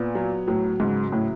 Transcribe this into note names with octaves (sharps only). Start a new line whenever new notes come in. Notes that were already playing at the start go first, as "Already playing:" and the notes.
Already playing: A#2 B3
F#3
A2 F#3
G#2 C#3
A2 E4